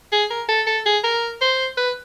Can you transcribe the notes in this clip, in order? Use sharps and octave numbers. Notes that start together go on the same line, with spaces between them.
G#4
A#4
A4
A4
G#4
A#4
C5
B4